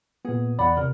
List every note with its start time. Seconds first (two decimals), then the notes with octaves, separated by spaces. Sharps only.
0.25 A#2 B3 G#4
0.59 E2 D5 F#5 B5
0.77 C3 A#4